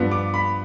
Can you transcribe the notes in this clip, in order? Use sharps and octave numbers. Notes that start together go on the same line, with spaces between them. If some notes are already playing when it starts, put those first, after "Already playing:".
Already playing: G2 F3 B3
D6
B5